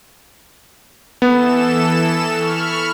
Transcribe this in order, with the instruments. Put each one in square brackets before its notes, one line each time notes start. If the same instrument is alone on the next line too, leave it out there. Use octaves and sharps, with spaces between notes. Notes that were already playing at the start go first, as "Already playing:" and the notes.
[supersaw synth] E3 A4 E7 [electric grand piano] B3
[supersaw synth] B5 C#6 F6